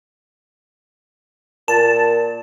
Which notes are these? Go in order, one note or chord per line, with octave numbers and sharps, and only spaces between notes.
A#2 A5